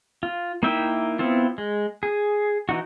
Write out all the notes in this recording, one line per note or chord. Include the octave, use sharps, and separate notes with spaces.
F4
A#3 D#4 E4 E5 G5
B3 C4 E4 F4
G#3
G#4
E3 D#4 F#4